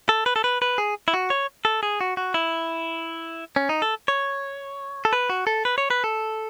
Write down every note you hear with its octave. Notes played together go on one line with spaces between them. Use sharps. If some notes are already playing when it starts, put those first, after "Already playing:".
A4
B4
A4
B4
B4
G#4
E4
F#4
C#5
A4
G#4
F#4
F#4
E4
C#4
D#4
A4
C#5
A4
B4
F#4
A4
B4
C#5
B4
A4